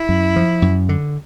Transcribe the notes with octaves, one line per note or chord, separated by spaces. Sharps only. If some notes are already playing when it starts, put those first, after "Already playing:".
Already playing: E4
F#2
F3
F#2
D3